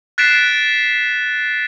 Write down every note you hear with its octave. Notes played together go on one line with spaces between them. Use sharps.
F#6 A6 B6 C7 D7 E7